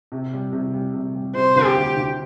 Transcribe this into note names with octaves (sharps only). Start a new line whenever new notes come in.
C3
G3
C3
G3
C3
G3
C3 C5
D2
G4
D2
D2